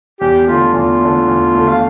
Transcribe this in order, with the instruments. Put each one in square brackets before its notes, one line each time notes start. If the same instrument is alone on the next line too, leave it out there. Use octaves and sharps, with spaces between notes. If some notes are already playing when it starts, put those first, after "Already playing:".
[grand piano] E2 [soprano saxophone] G4
[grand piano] D3 A3 [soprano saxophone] F4
[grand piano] E2 [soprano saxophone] F4
[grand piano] D3 A3
E2
D3 A3
[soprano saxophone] F5